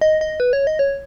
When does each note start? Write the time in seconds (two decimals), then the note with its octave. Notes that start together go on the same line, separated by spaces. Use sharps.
0.01 D#5
0.21 D#5
0.40 B4
0.53 C#5
0.67 D#5
0.79 C#5